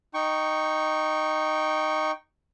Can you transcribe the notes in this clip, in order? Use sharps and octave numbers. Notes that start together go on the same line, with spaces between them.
D#4 G5 C#6